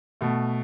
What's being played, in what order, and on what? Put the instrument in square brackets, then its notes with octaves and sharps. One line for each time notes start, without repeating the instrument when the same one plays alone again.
[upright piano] B2 A3